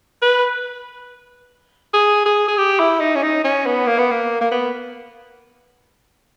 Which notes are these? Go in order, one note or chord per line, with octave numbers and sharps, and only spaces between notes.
B4
G#4
G#4
G#4
G4
E4
D#4
C#4
D#4
C#4
B3
A#3
B3
A#3
A#3
B3